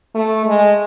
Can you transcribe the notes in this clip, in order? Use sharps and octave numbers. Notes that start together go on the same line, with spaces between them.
A3
G#3